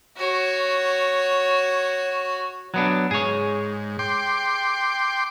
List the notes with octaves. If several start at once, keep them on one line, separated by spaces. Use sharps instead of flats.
F#4 C#5
F#3 B3 D4
G#2 G#4 C#5
G5 C6 D6